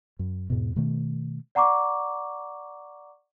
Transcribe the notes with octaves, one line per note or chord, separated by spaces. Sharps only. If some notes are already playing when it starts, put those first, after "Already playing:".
F#2
E2 G#2 B2
B2 D#3 A3
D5 F#5 A#5 C#6 D6